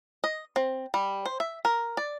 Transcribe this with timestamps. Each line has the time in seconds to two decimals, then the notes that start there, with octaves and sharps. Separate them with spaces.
0.24 D#5
0.56 C4
0.94 G3
1.26 C5
1.40 E5
1.65 A#4
1.97 D5